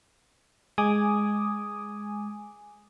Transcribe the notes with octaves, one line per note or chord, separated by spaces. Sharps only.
G#3 G#5 D6 D#6